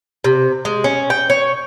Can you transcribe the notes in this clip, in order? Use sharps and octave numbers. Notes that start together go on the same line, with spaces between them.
C3
G#3
C#4
G5
C#5